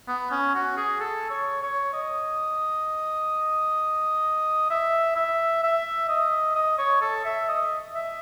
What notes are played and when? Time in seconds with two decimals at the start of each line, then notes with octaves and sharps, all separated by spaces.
0.08 B3
0.31 C#4
0.54 F#4
0.77 G#4
1.00 A4
1.30 C#5
1.62 C#5
1.93 D#5
4.70 E5
5.16 E5
5.63 E5
6.09 D#5
6.55 D#5
6.78 C#5
7.01 A4
7.25 E5
7.49 D#5
7.95 E5